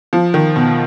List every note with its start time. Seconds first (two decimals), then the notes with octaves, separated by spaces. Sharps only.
0.13 F3
0.34 D#3
0.56 B2